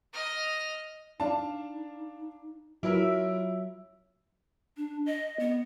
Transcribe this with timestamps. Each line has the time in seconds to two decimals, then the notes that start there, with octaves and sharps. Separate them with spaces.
0.13 D#5 F6
1.20 D4 D#4 F5 A5
2.83 F#3 E4 F4 A#4 E5
4.77 D4
5.06 D#5
5.40 B3